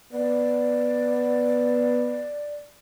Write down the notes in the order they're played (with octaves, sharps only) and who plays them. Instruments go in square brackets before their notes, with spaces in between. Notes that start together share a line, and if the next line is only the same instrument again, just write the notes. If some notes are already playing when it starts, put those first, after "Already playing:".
[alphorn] B3 [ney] D5